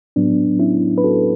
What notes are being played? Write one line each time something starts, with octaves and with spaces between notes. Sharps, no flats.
A2 F#3 B3 D4
C#4 E4
B4
F#4 A4